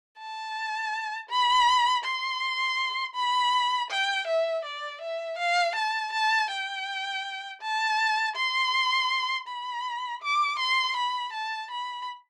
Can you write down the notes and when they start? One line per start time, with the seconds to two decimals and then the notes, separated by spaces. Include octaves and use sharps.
0.19 A5
1.30 B5
2.05 C6
3.15 B5
3.91 G5
4.28 E5
4.65 D5
5.01 E5
5.39 F5
5.76 A5
6.13 A5
6.51 G5
7.62 A5
8.36 C6
9.48 B5
10.23 D6
10.59 C6
10.97 B5
11.33 A5
11.71 B5